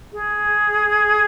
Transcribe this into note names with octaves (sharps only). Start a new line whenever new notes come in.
G#4